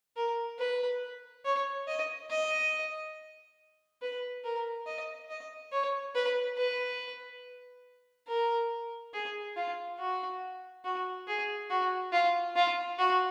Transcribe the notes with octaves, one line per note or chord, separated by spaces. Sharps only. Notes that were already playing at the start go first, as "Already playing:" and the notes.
A#4
B4
C#5
D#5
D#5
B4
A#4
D#5
D#5
C#5
B4
B4
A#4
G#4
F4
F#4
F#4
G#4
F#4
F4
F4
F#4